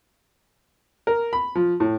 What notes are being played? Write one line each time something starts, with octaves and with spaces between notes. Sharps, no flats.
A#4
B5
F3
A2